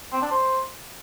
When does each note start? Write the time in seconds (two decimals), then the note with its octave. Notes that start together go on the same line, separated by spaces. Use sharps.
0.12 C4
0.22 D4
0.32 C5